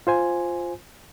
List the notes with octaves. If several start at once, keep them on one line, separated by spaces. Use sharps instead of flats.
F4 C5 G#5